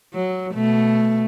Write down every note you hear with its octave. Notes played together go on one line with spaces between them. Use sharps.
F#3
B2 A3